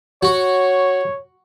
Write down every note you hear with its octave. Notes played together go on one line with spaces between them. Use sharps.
F#4 C#5